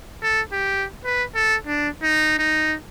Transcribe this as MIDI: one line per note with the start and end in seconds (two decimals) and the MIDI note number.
0.23 0.41 69
0.53 0.86 67
1.05 1.24 71
1.36 1.56 69
1.67 1.89 62
2.03 2.35 63
2.39 2.76 63